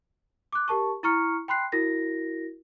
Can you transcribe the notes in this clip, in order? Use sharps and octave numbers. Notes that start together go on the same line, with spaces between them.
D6 F#6
G4 A#4 A5 C#6
E4 A#5 C#6 F6 C#7
G5 B5 C6 F#6 C7
E4 F#4 A#4 A#6